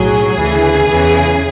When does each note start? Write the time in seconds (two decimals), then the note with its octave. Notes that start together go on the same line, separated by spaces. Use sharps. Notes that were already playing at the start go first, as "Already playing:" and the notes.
Already playing: B1 A2 F#3 G#4
0.39 D2 C#3 E3
0.90 E2 C#3 E3